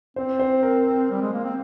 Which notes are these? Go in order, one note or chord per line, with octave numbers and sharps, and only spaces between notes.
C4 C5
C5
A#4
G3
G#3
A#3
C4